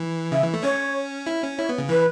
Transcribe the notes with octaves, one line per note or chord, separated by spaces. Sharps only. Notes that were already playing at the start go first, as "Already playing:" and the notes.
Already playing: E3
C#3 E5
E3
A3
C#4 C#5
E4
C#4
E4 C#5
B3
C#3
E3 B4